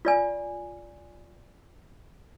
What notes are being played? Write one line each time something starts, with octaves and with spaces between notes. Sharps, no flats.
F4 D5 G#5